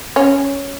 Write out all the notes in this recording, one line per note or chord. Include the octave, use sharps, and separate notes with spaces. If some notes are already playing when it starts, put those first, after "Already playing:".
C#4